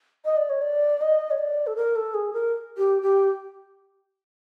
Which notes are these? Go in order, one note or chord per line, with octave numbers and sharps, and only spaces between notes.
D#5
D5
C#5
D5
D#5
C#5
D5
A4
A#4
A4
G#4
A#4
G4
G4